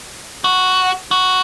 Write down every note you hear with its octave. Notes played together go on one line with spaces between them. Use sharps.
F#4
F#4